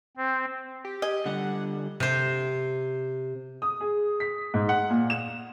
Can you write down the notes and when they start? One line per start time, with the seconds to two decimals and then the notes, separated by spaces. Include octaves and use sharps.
0.17 C4
0.85 G4
1.02 G#4 D#5
1.26 D3 G3 F#5
2.00 C3 C5
3.62 D#6
3.81 G#4
4.20 B6
4.54 G#2
4.69 F#5
4.90 A#2
5.10 E7